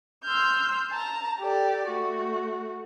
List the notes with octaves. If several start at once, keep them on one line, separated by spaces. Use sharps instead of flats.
C6 E6 F6 G6
A5 A#5
G4 A4 D5
A3 F#4